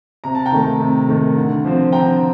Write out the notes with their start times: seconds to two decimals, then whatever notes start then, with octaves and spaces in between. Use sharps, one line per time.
0.24 C3 A#5
0.35 A5
0.46 G5 A#5
0.52 D#3 A3
0.80 C3
1.08 D#3 A3
1.37 D3
1.65 F3 C4
1.92 D3 G5 A#5